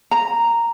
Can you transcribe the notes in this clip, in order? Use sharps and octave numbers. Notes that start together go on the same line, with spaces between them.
A#5